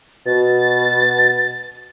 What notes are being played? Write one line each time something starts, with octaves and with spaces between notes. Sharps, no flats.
B2 A6